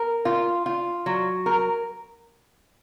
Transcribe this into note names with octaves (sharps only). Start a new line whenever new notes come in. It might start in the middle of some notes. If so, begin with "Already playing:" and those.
Already playing: A#4
F4
F4
F#3
A#4